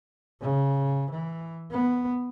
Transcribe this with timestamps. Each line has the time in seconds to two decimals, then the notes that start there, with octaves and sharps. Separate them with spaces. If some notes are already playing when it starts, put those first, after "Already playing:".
0.41 C#3
1.11 E3
1.71 B3